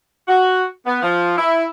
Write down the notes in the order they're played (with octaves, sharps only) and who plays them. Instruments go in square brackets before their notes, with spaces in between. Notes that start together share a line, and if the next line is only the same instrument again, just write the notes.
[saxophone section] F#4
B3
F3
E4